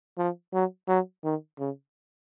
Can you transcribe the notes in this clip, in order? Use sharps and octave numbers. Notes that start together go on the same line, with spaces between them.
F3
F#3
F#3
D#3
C#3